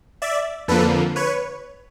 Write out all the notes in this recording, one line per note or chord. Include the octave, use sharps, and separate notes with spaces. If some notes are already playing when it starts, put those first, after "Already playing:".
D5 E5
F2 D3 F3 A#3 A4 B4
B4 C#5